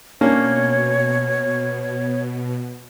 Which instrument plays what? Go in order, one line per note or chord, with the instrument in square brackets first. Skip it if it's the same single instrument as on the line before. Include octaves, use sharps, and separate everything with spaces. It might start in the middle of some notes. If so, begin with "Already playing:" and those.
[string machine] B2 [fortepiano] A#3 C#4 D4 [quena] C#5